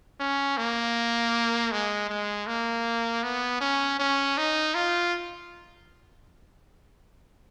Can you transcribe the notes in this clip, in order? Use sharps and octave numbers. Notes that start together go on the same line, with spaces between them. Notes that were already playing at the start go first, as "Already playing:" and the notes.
C#4
A#3
G#3
G#3
A#3
B3
C#4
C#4
D#4
F4